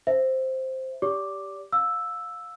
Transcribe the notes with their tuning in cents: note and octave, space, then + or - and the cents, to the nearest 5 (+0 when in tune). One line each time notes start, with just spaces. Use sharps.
C5 +0 E5 +0
G4 +0 D5 -35 D6 +0
F5 +25 E6 +0